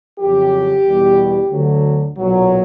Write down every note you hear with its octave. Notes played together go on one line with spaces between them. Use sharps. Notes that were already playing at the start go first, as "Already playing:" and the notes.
F2 C#3 F#3 G4
E2 B2 G3
D2 D3 F#3
B1 A#2 F#3